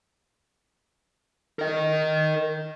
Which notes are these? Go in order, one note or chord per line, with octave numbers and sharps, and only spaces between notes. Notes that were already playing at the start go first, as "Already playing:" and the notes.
A#4 D#5